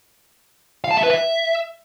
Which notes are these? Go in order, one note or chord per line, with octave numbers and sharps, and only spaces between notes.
F5
A5
E5
B4
E5